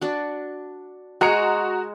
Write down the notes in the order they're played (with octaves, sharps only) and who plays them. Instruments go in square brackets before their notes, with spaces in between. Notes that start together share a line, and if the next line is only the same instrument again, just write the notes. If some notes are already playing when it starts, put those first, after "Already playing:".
[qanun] D4 F#4
[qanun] G#3 [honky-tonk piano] F#4 A#5 C#7